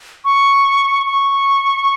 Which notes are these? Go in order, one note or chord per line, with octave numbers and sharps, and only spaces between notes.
C#6
C#6